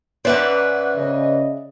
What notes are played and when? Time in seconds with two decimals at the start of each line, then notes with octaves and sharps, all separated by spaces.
0.25 G#2 C#4 B4 D5 E5 F#5 F#6
0.97 C#3 D#5